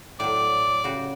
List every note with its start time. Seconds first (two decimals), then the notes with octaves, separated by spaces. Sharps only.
0.20 A2 F#3 D5
0.84 C#3 F#4 G4